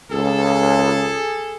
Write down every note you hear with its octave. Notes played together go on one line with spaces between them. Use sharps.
C#2 G#4 A4